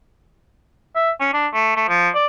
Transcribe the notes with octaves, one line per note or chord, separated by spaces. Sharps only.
E5
C#4
D4
A3
A3
F3
D5